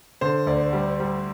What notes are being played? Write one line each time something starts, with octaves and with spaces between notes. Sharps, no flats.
D3 C5
D2 D5
G3
G3